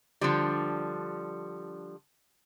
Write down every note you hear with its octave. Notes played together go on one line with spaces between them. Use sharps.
D3 F3 G3